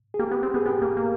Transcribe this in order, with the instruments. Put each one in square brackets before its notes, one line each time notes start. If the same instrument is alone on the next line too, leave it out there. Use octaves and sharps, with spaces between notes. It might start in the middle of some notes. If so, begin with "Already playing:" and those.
[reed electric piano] G#4
[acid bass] A#3 [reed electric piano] G4
[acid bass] B3
C4
[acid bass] B3 [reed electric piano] G#4
[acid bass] B3 [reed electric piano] G4
[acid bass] A#3
A#3